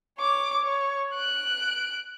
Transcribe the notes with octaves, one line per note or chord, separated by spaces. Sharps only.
C#5 D6
C#5
F#6 D7